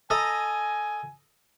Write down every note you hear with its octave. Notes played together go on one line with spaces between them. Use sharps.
A4 D#5 G#5 A#5